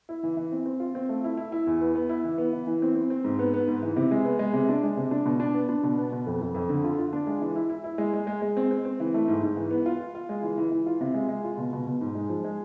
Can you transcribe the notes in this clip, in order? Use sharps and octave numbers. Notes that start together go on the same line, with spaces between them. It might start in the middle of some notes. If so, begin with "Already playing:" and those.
E4
E3
E3
C4
C4
F4
C4
A3
E4
E4
E4
E2
B3
B3
E4
E3
B3
E3
E3
C4
C4
C4
G#2
B3
B3
G#2
E3
C3
G#3
B3
G#3
C3
D4
G#3
C3
D4
B2
D4
B3
D4
B2
B3
B2
F2
F2
F2
D3
F4
F4
D4
G#3
E3
E4
E4
E4
G#3
G#3
G#3
G#3
C4
C4
C4
E3
A3
G#2
G#2
E3
B3
F4
F4
F4
G#3
E3
E3
E3
F4
C3
G#3
G#3
F4
B2
B2
B2
G#2
G#3
F3
G#3